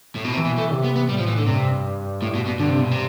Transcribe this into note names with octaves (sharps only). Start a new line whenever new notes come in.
A2
B2
C3 E3
B2
A3
C3
B3
B3
A2 G3
F3
E3
D3
G2 C3
A2
B2
B2
G2 D3
C3
B2
C3